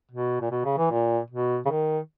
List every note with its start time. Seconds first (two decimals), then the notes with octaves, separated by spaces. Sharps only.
0.11 B2
0.41 A#2
0.51 B2
0.65 C#3
0.78 E3
0.91 A#2
1.30 B2
1.65 C#3
1.71 D#3